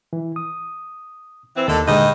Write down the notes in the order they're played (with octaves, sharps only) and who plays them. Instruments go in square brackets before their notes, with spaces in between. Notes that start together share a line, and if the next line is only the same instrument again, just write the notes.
[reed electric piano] E3
D#6
[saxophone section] E3 C4
[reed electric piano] D#2 [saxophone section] D3 D#3 A4
[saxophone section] G2 D#4 D#5 [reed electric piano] A#2 D3 G#3